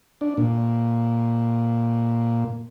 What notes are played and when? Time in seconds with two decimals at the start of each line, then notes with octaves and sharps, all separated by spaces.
0.21 D4
0.37 A#2